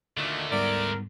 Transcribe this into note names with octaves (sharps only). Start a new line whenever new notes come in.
D2 A#2 D3 D#3 A3
G#2 G3 B3 A#4 D5